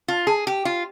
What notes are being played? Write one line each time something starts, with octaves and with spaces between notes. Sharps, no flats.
F4
G#4
G4
F4